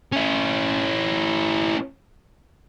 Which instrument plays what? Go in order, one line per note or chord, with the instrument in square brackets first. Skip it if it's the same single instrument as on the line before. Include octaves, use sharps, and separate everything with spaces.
[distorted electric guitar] C#4 E4